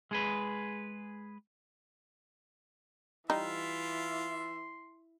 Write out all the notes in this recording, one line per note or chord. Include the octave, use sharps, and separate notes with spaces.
G#3 G#4 B4
E3 G3 D#4 F4 E5 C6